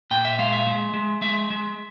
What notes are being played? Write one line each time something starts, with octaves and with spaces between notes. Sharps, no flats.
A#2 G5
E5
G#3 F5
E5
G#3
G#3
G#3 E5
G#3